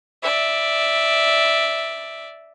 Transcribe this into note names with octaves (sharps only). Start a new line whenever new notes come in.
D5 E5